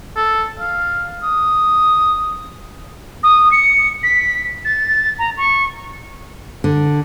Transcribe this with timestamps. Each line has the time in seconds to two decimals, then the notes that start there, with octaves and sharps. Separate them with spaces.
0.16 A4
0.60 F5
1.23 D#6
3.23 D#6
3.51 C#7
4.03 B6
4.64 A6
5.18 A#5
5.37 C#6
6.64 D3